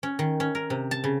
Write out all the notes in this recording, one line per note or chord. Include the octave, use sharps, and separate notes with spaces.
C#4
D#3
C#4
A#4
C3
A5
C#3